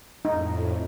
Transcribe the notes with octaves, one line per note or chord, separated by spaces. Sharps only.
F2 A2 D#4